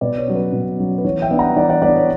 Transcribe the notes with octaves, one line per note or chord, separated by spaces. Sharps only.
B2 B4 D5
C#5
F#3 C#4
B4
B2
F#3 C#4
B4
E3 C#5
E5 G5
B3 D4
F#5 A#5
E3 D5 F#5
D5 F#5
B3 D4 B4 D5
C#5